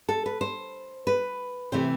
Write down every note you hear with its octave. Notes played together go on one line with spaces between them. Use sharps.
A4
B4
C5
B4
C3 E3 A3 C4 C5